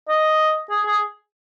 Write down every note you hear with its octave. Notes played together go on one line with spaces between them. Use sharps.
D#5
G#4
G#4